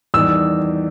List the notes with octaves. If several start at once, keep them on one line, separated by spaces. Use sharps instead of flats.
E2 D#3 G3 E6